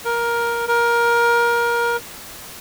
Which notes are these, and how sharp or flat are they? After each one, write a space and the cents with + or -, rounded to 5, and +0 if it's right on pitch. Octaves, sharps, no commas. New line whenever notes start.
A#4 +10
A#4 +20